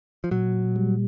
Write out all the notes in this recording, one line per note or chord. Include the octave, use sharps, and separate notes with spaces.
F3
A#2 F#3
G3